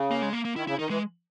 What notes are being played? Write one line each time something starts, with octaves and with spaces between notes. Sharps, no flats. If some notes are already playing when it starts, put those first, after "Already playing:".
Already playing: C#3
A#3
G#3
A#3
A#3
D#3 E4
C#3 E4
D#3 D#4
E3 G#3